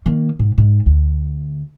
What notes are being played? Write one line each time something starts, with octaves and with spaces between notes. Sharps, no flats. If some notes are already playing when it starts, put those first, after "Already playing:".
D#3 A#3
G#2
G#2
D2